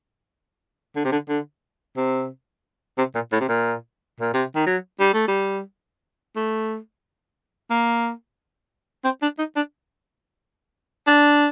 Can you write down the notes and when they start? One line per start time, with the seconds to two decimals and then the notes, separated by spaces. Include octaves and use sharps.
0.96 D3
1.05 C3
1.12 D3
1.29 D3
1.97 C3
2.98 C3
3.15 A#2
3.32 A2
3.41 C3
3.49 A#2
4.21 A#2
4.34 C3
4.55 D#3
4.66 F#3
5.00 G3
5.14 A3
5.28 G3
6.36 A3
7.70 A#3
9.04 C4
9.22 D4
9.38 D#4
9.56 D4
11.07 D4